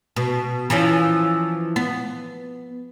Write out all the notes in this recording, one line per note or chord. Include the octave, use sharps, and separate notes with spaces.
B2
E3 F3 C#4
B3